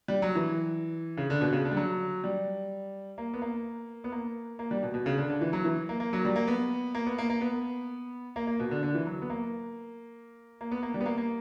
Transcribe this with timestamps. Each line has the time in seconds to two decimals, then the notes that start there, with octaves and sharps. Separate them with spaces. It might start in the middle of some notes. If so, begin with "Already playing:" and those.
0.08 G3
0.22 F#3
0.35 E3
1.17 C#3
1.30 D3
1.41 B2
1.53 C#3
1.65 D3
1.72 G3
1.77 F#3
2.24 G3
3.18 A#3
3.33 B3
3.42 A#3
4.04 B3
4.12 A#3
4.59 A#3
4.71 G3
4.83 B2
4.94 B2
5.06 C#3
5.18 D3
5.29 D3
5.41 E3
5.53 F#3
5.65 E3
5.89 A#3
6.00 A#3
6.13 F#3
6.25 G3
6.36 A#3
6.47 B3
6.94 A#3
7.06 B3
7.18 A#3
7.29 A#3
7.41 B3
8.36 A#3
8.47 A#3
8.59 B2
8.71 D3
8.83 D3
8.94 E3
9.06 F#3
9.22 B3
9.30 A#3
10.61 A#3
10.71 B3
10.82 A#3
10.94 G3
11.00 B3
11.06 A#3
11.18 A#3